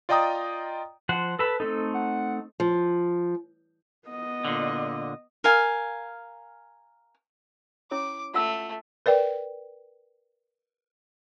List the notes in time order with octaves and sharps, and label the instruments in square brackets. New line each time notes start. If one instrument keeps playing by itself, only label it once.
[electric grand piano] F4 D5 D#5 G5 A#5 D#6
[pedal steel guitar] F3 C5 F#5
[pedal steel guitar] A4 A5 B5 [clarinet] B4
[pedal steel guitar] A3 C4 D#4 [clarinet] A4
[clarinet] F#5
[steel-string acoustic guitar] F3
[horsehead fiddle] B3 D#5
[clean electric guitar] A#2 D3
[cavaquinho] A#4 F5 G#5
[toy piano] C#4 E4 C#5 [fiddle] D6
[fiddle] A3 [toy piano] F4 F#5 E6
[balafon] A#4 B4 D5 G5